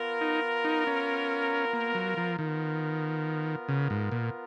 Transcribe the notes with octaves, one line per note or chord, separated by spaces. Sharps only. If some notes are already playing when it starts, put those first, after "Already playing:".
Already playing: B3 F4 A#4
D#4
D#4
C#4
A#3
F#3
F3
D#3 B3 F4 A#4
C#3
G#2
A#2